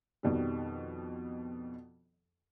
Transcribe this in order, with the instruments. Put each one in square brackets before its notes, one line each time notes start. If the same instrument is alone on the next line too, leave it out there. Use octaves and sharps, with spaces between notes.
[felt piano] F2 B2 D#3 G3